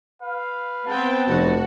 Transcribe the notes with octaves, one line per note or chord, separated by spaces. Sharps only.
B4 F5
B3 C4 G5 A5
F1 F#4